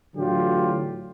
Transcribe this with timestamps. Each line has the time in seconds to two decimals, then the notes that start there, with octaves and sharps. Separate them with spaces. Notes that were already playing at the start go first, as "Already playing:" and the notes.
0.17 A2 D3 E3 F#3 F4 G4